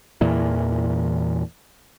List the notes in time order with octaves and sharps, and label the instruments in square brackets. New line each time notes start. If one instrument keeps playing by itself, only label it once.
[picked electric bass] E2 A#2 E3